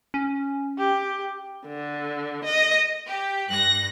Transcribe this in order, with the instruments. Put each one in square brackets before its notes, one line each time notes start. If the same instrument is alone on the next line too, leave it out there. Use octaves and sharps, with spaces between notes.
[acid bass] C#4
[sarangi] G4
[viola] D3
D#5
[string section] G4
G2 F#6 A#6